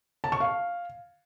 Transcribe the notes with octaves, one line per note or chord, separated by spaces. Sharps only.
A5
C#6
F5